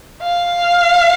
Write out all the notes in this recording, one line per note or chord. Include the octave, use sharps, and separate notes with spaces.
F5